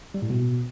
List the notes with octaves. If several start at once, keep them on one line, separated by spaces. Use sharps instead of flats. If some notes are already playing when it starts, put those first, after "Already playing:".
G3
A2
B2